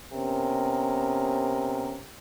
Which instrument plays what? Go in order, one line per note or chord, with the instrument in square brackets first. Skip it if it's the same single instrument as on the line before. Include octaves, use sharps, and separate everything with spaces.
[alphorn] C3 [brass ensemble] B3 C#4 A#4